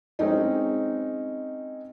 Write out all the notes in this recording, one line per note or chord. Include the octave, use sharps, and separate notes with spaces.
G#3 C4 C#4 D#4